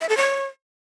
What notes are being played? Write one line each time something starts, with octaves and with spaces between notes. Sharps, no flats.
E5
A4
C#5